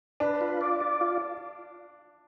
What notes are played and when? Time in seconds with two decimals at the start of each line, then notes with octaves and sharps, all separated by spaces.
0.20 D4 B4
0.41 F4
0.61 D5
0.80 D5
1.01 F4